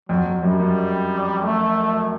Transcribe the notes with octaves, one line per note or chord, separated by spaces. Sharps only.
F2 F#3
F2
F#2 G3
F#2
A3